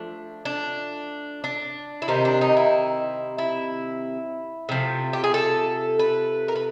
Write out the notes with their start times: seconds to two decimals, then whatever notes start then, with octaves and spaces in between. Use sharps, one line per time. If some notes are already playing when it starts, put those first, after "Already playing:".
Already playing: F3 A3 D4
0.45 D4
1.44 D4
2.02 E4
2.08 C3 D#3 G3 C4 D#4
2.25 D4
2.41 D#4
2.57 E4
3.38 E4
4.69 C3 F3 A3
5.13 G4
5.24 G#4
5.34 A4
5.99 B4
6.48 A#4
6.55 B4